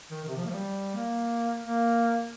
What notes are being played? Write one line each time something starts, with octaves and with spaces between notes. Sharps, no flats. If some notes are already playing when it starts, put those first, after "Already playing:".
D#3
D#3
C3
F3
A#3
F3
G3
A#3
A#3